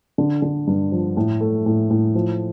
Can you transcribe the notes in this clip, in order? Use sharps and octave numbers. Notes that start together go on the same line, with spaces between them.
D3
D3
G2
F3
A2
A3
A2
A2
F3